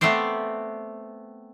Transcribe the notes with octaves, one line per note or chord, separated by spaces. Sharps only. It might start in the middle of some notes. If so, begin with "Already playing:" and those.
A3 B3 C4 C5 D5